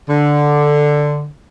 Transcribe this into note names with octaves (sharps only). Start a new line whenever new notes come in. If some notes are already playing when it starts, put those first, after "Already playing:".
D3